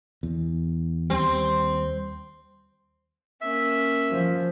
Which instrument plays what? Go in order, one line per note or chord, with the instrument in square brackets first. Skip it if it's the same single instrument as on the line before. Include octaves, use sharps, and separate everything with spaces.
[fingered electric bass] E2
[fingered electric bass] D#2 G3 [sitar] C4
[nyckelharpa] A#3 C#4 [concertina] E5
[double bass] F3